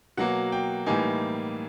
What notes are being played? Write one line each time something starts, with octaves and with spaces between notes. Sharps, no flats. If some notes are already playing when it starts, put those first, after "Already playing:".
B2 F#3 A#3 F#5
G5
A2 E3 G3 A#3 D#4 G#5